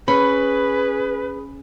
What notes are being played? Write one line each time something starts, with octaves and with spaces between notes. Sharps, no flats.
C#4 G#4 B4 B5